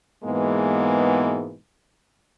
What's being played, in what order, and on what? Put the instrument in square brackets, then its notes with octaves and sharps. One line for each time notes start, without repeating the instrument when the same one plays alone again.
[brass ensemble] G#2 B2 E3 G#3 A#3 B3